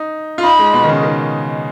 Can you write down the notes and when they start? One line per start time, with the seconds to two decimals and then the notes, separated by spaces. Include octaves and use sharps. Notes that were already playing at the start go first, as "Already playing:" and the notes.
Already playing: D#4
0.38 F4
0.44 D#4 B5
0.59 G#3
0.73 B2
0.83 D#3
0.88 C#3
1.03 D#3